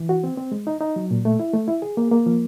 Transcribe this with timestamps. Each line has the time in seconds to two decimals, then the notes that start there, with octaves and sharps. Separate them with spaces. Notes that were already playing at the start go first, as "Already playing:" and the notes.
Already playing: E3
0.09 F#4
0.24 C4
0.37 C4
0.52 G#3
0.67 D#4
0.81 D#4
0.96 F#3
1.11 A#2
1.25 A3
1.40 E4
1.53 A3
1.68 E4
1.82 G#4
1.97 A#3
2.11 A#3
2.26 F3